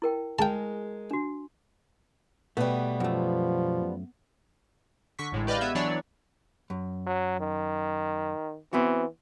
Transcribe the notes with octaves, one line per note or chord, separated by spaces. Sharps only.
E4 A#4 G5
G#3 G#4 A#4 G5 A5 A#5
D4 F#4
B2 G3 A3 B3
F#2 F3 A3
D3 C#6 B6
A1 A2 G#3
G4 B4 D5 D#5 F5 G5
B3 E5 G#6
E3 F#3 D4 C#5 D5
F#2
F#3
D#3
E3 B3 C4 F#4